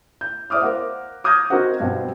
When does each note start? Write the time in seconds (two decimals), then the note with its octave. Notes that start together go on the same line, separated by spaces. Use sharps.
0.21 G6
0.50 C5 D5 E5 D6 D#6 F6
0.62 A#4 C5 F5 F#5 D6
1.24 D6 D#6 F6 G6 G#6 A#6
1.50 C4 D#4 F#4 A#4 C5 F#5
1.80 G2 B2 G3 C4